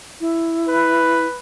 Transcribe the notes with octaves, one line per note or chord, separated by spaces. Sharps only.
E4
B4